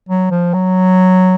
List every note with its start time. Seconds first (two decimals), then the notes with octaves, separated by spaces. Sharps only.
0.09 F#3
0.31 F3
0.54 F#3